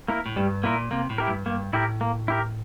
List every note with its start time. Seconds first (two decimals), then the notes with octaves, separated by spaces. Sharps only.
0.08 A#3 E4 A#4
0.26 A2
0.36 G2 G3
0.63 A#2 A#3 E4 A#4
0.91 C3 A#3
1.10 A2
1.18 E4 G4 A#4
1.28 G2
1.46 G2 A#3
1.73 A2 E4 G4 A#4
2.01 A#3
2.28 E4 G4 A#4